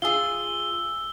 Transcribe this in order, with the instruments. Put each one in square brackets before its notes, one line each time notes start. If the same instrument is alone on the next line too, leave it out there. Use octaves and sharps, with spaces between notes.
[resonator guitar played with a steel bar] F4 G#4 [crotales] E6 G7